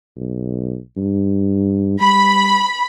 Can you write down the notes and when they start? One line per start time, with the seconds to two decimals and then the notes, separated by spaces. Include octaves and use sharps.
0.16 B1
0.97 G2
2.01 G3 B5